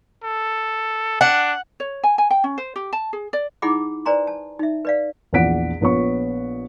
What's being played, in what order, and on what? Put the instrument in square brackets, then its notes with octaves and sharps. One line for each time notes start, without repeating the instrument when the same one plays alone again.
[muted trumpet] A4
[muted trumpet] D4 [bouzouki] F#5
[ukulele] C#5
G#5
G#5
G5
C#4
C5
G4
A5
G#4
D5
[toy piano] D#4 E4 G#4 F#5 B5 D6
B4 C5 D5 G#5 A#5 C6
A5
D#4 E5
B4 D5 F5
[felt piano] A#1 E2 D5 F#5 B6 D7
A#1 B3 C#5 C#6